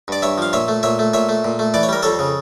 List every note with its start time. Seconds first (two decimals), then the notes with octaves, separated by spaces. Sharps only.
0.08 G2 D5
0.22 G2 C#5 E5
0.38 F3 F5
0.53 A#2 C#5 E5
0.68 A3
0.83 A#2 C#5 E5
0.99 A3
1.14 A#2 C#5 E5
1.29 A3
1.45 A#2
1.59 A3
1.74 E3 D5
1.83 C#5
1.89 G3 A#4
2.03 F2 A4 C#5
2.19 C#3